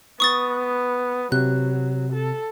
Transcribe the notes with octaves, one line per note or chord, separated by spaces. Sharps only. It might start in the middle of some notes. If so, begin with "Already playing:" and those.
B3 C#6 D#6 A6
C3 F#3 F#6
A4